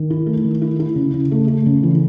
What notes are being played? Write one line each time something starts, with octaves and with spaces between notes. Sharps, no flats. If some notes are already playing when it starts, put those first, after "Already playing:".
Already playing: D#3
E4
A3
D#3
E4
E4
C#3
C#3
A3
A3
C#3
E3